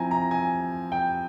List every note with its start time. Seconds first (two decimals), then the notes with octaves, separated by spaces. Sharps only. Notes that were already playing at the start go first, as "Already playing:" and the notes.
Already playing: F3 C4 E4 G#5 A#5
0.11 A#5
0.31 G#5
0.92 G5